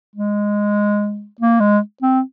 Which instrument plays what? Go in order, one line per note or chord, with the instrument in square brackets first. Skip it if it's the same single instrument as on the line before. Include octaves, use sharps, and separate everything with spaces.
[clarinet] G#3
A#3
G#3
C4